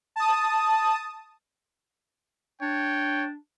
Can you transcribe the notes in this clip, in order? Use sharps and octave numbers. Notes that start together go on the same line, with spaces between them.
A5 D#6
D4 C#5 G5